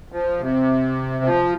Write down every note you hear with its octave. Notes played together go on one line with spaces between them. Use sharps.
F3
C3
F3